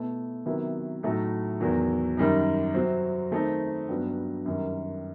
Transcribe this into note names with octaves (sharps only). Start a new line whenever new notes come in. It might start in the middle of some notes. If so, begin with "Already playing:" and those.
Already playing: B2 A3 E4
C3 D#3 F#3 B3 E4
A2 F#3 A3 D#4
E2 D#3 F#3
F#2 D#3 G3 D#4
C3 F#3 C4
D#3 A3 C4 D#4
G2 F#3 B3
F#2 D#3 G3